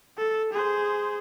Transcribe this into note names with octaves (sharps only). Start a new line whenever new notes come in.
A4
G#4 C5